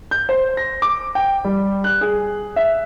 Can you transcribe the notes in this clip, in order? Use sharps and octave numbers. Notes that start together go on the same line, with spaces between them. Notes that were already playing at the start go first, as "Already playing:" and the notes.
G6
C5
A#6
D6
G5
G3
F#6
G#4
E5